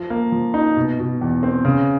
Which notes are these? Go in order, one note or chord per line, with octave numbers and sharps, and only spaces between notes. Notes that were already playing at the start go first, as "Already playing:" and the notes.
Already playing: F3
A#3
F3
D#4
B2
B2
E2
C4
C#3